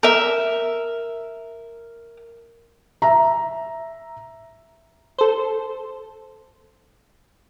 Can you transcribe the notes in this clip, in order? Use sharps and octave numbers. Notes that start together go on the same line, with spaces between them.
A#4 E5
E5 A#5
A4 C5